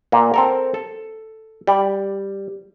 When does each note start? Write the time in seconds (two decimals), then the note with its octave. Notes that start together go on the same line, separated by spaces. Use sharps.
0.12 A#2 A#3
0.34 C4 A4 A#4
0.74 A4
1.67 G3 D5